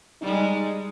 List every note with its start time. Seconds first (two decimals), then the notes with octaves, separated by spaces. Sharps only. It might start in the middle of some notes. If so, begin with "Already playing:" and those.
0.21 G3 G#3 D#4